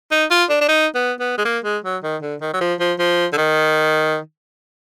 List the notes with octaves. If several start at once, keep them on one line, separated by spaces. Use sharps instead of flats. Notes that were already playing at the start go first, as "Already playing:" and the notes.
D#4
F4
D4
D4
D#4
B3
B3
G#3
A#3
G#3
F#3
D#3
D3
D#3
F#3
F3
F3
F3
D3
D#3